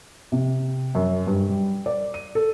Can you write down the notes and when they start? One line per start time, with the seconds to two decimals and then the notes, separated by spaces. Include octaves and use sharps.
0.32 C3
0.95 F#2
1.27 G2
1.49 G3
1.86 D5
2.14 D#7
2.35 A4